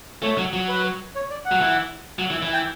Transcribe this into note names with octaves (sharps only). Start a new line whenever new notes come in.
A3 C#5
F#3
F#3
B4
C#5
D5
F#5
F#3
E3
F#3
E3
E3
G5